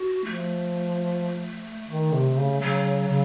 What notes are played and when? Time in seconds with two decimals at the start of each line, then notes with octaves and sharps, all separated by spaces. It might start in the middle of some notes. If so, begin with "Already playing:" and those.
Already playing: F#4
0.24 F3 A3
1.90 D#3
2.13 C3
2.37 C#3
2.61 C#3 F#3
3.08 C#3